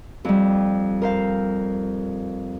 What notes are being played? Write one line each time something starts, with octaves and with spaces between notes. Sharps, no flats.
F2 G3
A#4 C5 F5